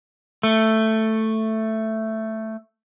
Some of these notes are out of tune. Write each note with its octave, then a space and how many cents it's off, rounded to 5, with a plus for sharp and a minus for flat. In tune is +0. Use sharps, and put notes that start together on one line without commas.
A3 +5